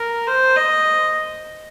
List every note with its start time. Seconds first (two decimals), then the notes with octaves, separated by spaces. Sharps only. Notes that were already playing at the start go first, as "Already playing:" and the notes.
Already playing: A#4
0.27 C5
0.56 D#5